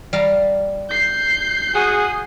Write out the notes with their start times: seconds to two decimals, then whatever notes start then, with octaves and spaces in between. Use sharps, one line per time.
0.13 G3 F5 A#5
0.89 G6 C7
1.74 F#4 G#4